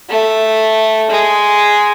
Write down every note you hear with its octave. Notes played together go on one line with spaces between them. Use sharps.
A3
G#3